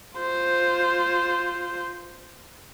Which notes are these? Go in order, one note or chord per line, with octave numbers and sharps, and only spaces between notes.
F4 C5